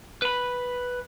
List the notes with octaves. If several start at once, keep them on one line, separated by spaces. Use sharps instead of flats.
B4 B5